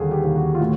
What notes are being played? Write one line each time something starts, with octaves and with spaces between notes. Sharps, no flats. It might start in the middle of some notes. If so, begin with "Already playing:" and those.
Already playing: D#2 D3 G3 G#4
G4
D#2
F#4
F4
A2 F#4